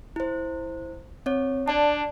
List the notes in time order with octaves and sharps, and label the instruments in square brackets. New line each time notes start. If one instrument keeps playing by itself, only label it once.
[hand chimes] E4 C5
C4 C#5
[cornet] D4 [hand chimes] D5 A5